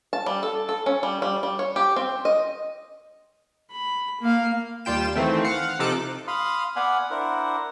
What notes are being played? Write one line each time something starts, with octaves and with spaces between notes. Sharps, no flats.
A5
G3
A4
A4
C#4
G3
G3
G3
C#5
G4
C4
D#5
B5
A#3 F5
D#2 G3 F4 G5 E7
D#3 E3 A3 C4
F5 F#5
C3 F3 D#4 A4 D6 F#6
F5 B5 C6 D#6 F6
B3 D5 F5 F#5 G#5 B5
D4 E4 A#4 C5 F#5